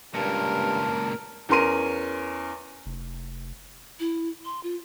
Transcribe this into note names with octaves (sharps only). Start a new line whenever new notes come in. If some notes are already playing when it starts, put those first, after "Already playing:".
C#2 G2 A#2 A#4 A5
E2 C#4 A#4 C6 D#7
F1
E4
C6
F4